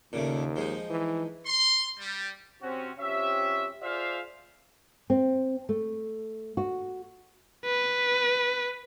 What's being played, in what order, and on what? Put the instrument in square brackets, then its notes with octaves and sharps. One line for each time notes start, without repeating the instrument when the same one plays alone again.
[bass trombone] D#2 [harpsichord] A#2 C#3 A3
[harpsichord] F3 G#3 D#4
[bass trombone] E3
[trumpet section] C6
G3
[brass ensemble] C3 C4 C#4 F#4
F3 C4 C#4 G4 E5
F4 G#4 C5 D5 E5 F5
[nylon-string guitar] C4
A3
F#4
[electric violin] B4